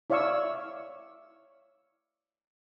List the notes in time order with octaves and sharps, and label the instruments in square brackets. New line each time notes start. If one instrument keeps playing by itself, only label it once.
[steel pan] E4 C#5 D5 F5 C#6 E6